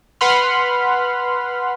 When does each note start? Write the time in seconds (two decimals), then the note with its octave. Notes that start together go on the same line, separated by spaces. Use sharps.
0.21 B4 F#5 B5 C6 F6